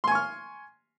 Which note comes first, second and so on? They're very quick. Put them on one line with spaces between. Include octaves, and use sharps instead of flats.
C6 G#5 C#6 F6